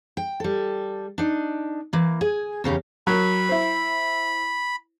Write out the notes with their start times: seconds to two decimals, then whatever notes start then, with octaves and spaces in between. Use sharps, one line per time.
0.17 G5
0.40 G3 A4
1.18 D4 D#4
1.93 E3 A#3
2.21 G#4 G#5
2.64 E2 C#3 C#4 G4
3.07 F#3 A#4 B5
3.49 E4 C5